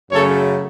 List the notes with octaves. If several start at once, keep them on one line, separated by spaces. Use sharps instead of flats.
F#2 C#3 F#3 A3 A4 C#5